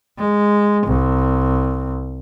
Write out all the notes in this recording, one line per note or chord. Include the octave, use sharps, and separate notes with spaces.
G#3
C2